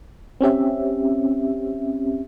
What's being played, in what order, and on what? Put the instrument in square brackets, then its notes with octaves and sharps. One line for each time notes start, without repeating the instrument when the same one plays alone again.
[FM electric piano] C4 C#4 G4 E5